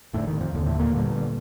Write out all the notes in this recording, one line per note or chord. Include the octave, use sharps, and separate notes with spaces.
F1 F2 A2 D3 A3
D#3
F2 F3
F1 D#2 D3
A2 A3
A#2 A#3
G1 G2 D3